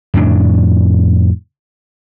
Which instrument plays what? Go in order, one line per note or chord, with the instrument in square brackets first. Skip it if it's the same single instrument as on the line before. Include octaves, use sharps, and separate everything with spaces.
[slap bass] F2 A2 C#3 D4